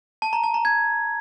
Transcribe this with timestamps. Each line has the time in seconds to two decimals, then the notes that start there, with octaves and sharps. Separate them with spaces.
0.22 A5
0.33 A#5
0.43 A5
0.54 A#5
0.65 G#6